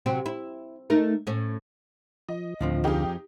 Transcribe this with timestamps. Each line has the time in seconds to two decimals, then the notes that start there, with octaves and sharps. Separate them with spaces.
0.06 C3 F#3 C4
0.26 E4
0.90 A3 D#4 A#4
1.27 A2 C#4
2.29 F3 D#5
2.61 D2 A2 D3 F3 C4 F4
2.84 F2 F3 D#4 G4 G#4